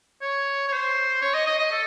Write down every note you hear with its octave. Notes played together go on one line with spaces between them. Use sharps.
C#5
C#5
C5
C#5
D#5
D#5
D#5
A4